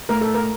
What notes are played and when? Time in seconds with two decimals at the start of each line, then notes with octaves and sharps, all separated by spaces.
0.09 A2 A#4
0.21 A4
0.34 A#4